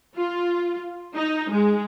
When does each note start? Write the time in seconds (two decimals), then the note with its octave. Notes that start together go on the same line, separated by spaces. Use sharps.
0.16 F4
1.16 D#4
1.51 G#3